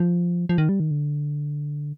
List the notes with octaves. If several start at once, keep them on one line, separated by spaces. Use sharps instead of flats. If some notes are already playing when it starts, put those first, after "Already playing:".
Already playing: F3
F3
D#3
G3
D#3
D3